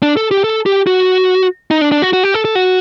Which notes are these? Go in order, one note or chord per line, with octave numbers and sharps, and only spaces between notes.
D4
A4
G4
A4
G4
F#4
D#4
D4
D4
F#4
F#4
G4
A4
A4
F#4